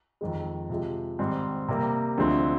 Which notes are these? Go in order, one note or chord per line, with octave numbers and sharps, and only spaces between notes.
F2 D#3 G#3
C3 F3 G#3
G#2 D#3 G3 C4
C3 G3 A#3
D2 D3 F3 G#3 C4